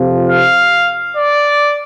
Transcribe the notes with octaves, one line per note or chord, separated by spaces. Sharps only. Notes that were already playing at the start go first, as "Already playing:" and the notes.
Already playing: F2 C3 F3
F5
D5